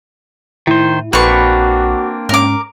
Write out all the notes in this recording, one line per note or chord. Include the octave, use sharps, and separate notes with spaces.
A2 D#3 E4 C5
A#1 A#3 C4 D4 F#4 B4 C#6
G#2 C#4 A#4 D6